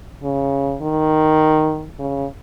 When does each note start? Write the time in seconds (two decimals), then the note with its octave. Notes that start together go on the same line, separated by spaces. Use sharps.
0.23 C#3
0.82 D#3
1.99 C#3